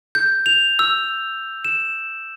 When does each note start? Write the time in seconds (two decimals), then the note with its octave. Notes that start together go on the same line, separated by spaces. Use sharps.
0.15 G6
0.46 F7
0.79 E6
1.65 E7